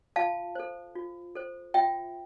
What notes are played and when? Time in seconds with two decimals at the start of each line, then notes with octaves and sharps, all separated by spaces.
0.16 F4 F5 A5
0.55 A4 C5
0.95 F4
1.35 A4 C5
1.74 F4 E5 G5